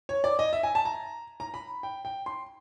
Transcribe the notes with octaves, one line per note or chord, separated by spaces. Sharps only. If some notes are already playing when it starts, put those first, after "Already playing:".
C#5
D5
D#5
E5
G#5
A5
A#5
A#5
B5
G5
G5
C6